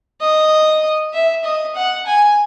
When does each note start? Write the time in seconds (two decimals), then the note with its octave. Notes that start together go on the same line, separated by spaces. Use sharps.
0.21 D#5
1.13 E5
1.44 D#5
1.75 F#5
2.06 G#5